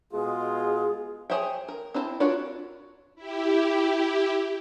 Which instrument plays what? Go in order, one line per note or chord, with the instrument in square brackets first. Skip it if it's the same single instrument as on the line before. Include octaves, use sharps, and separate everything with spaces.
[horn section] B2 G#3 F4 [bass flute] G#4
[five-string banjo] G#4 C5 C#5 E5 G5
A#4
C4 D4 E4 C5 A5
D4 F4 F#4 A#4 C#5
[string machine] E4 G4